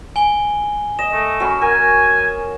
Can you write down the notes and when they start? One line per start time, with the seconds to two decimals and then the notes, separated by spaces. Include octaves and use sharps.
0.16 G#5 G7
0.99 D#5 E7
1.12 A3
1.40 F#3 C#4 B5
1.61 A#4 G#5